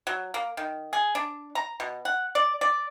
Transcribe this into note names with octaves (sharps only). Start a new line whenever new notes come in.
F#3
A#3
D#3
G#4
D4
A#5
B2
F#5
D5
D5